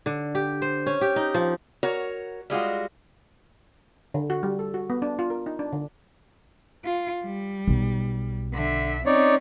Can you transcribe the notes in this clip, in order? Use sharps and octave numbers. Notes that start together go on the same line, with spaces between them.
D3
G4
C5
C#4
G4
D#4
F3
F#4 A#4 C#5
G3 G#3 F4 F#4
D3
F#4
G3
A4
F#4
B3
D4
F4
A#4
D#4
D4
D3
F4
G3
B1
D3 E5
C4 C#4 D#4 C#5 D5